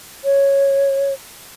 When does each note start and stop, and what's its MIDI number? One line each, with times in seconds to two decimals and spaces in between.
0.24 1.13 73